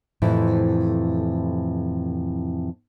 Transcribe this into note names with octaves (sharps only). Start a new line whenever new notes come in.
F2 A2 C3 E3 E4